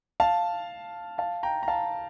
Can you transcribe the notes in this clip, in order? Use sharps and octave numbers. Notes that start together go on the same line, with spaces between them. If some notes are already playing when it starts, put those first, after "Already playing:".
F5 A5
F5 A5
G5 A#5
A#5
F5 A5